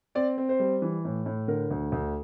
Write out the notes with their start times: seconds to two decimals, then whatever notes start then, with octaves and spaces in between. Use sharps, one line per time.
0.15 C4 D5
0.38 C4
0.49 C5
0.60 G3
0.82 E3
1.05 A2
1.26 A2
1.48 D3 A#4
1.71 D2
1.92 D2